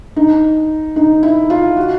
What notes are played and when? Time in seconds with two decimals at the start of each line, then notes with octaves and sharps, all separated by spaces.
0.16 D#4
0.96 D#4
1.23 E4
1.50 F4
1.77 F#4